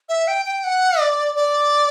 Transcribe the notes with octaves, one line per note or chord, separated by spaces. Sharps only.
E5
G5
G5
F#5
D5
D5